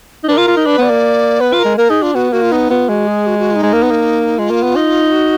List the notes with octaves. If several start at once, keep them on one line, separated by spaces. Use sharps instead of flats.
D#4
D4 B4
F4 A#4
F4
D#4
D4 B4
B3
D5
A#3
B3 B4
F4
A#4
G#3
A#3 A#4
D#4 G#4
D4 F4
B3 F#4
A#3 F#4
F4
B3 D#4
B3 F4
G#3 F#4
G#4
F#4
F#4
F4
D#4
G#3
A#3
B3
A#3
G#3 F4
A#3
B3
D#4
F#4